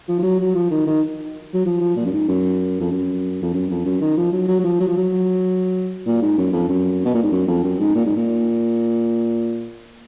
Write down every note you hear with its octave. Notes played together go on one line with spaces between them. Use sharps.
F3
F3
F#3
F#3
F3
D#3
D#3
F#3
F3
F3
A#2
F#2
G#2
F#2
F2
F#2
F2
F#2
F2
F#2
D#3
F3
F#3
F#3
F#3
F3
F#3
F3
F#3
A#2
G#2
F#2
F2
F#2
B2
A#2
G#2
F#2
F2
F#2
G#2
A#2
G#2
A#2